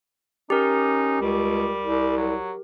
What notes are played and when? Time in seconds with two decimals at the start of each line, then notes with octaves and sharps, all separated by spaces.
0.50 C#4 D#4 G4 A#4
1.21 C#2 G3
1.83 C2
2.17 F#3